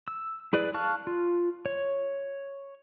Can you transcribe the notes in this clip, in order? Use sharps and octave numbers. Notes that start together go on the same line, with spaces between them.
E6
E4 G#4 B4 D5
F5 A5 C#6 F6 F#6
F4
C#5